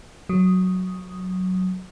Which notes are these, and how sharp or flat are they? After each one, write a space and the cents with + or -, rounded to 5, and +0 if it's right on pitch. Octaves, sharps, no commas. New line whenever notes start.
F#3 +0 D#6 +0